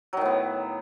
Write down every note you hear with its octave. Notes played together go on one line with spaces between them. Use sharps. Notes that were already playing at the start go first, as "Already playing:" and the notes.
A2 D#3 F#3 B3